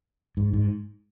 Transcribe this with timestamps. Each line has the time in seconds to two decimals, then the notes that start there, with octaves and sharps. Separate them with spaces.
0.37 G#2
0.53 G#2